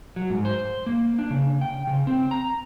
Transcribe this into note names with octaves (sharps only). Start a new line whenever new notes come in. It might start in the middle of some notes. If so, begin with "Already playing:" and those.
F#3
G#2
C5
A#3
D4
C#3
G5
C#3
C4
A#5